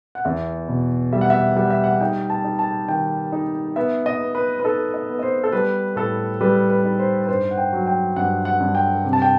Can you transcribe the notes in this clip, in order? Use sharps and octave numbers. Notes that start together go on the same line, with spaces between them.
F#5
E2 E5
B2
G3 E5
F#5
E5
G3 F#5
E5
F#5
D#4 G5
A5
D#4
A5
D#3 G5
D#4
B3 E5
D#5
B3
B4
B4
D#4 A4
D#5
B3
D#5
C5
A4
G3 B4
A2 A4
G3 B4
B4
D#4
C5
B4
G2 C5
F#5
G5
F#3
G5
G2 F#5
F#5
G2
G5
C3
A5
G5